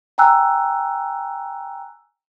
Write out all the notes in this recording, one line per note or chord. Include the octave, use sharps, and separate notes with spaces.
G5 G#5 A#5 E6 F#6